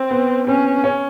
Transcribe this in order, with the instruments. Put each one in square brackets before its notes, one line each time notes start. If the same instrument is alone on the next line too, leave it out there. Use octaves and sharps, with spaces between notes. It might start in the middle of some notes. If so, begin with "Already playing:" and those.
Already playing: [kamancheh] C4
[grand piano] B3
[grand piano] C4 [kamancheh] C#4
[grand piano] C#4